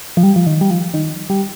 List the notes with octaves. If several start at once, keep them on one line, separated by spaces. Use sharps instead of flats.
F3
G3
F3
D#3
G3
F3
D#3
G3